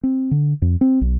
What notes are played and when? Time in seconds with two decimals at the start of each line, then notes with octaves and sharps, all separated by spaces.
0.03 C4
0.31 D3
0.62 F2
0.81 C4
1.01 B1